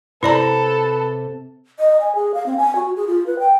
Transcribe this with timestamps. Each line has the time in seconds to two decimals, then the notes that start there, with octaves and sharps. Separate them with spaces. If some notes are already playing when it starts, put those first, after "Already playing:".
0.23 C3 E4 A4 B4 D5 A#5
1.79 D#5
2.01 G#5
2.15 G#4
2.34 F5
2.46 C4
2.57 G#5
2.76 F#4
2.96 G#4
3.07 F4
3.27 B4
3.39 G5